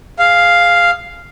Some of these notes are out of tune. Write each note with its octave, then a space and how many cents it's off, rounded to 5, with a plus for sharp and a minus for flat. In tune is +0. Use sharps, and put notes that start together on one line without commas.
G#4 +0 F5 +0